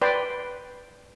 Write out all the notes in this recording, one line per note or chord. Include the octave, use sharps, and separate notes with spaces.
B4 D5 G5 C6